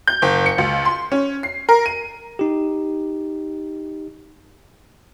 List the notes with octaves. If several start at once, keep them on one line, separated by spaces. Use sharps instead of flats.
G6
F#1
C#7
C#2
C6
C#4
C7
A#4
D#7
D#4 G4